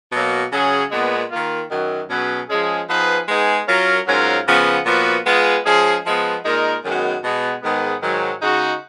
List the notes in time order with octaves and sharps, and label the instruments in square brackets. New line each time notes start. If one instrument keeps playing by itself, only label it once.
[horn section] B2 F#3 A#3
C#3 F#3 C#4 G#4
A#2 G#3 B3
D#3 A#3 F4
F#2 D#3 F#3
B2 F#3 C#4 G#4 B4
F3 G#3 C#4 G#4
F3 B3 D#4 G#4 B4
G#3 B3 D#4 G#4
F#3 C#4 F4 A#4
G#2 F#3 C#4 F4 A#4
C#3 F3 B3
A#2 F3 B3 F#4 B4
G#3 B3 F4 G#4
F3 G#3 C#4 G#4
F3 G#3 B3
A#2 G#3 D#4 A#4
F#2 D#3 G#3 B3 F#4
B2 G#3 B3
G#2 D#3 G#3 B3
G#2 D#3 F#3
C#3 G#3 D#4 F#4